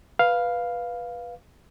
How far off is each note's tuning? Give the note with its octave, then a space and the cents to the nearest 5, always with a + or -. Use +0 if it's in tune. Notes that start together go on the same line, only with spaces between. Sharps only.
B4 -10 F5 +0